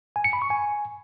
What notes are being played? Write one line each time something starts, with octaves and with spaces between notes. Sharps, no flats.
G#5
C#7
B5
C#6
G#5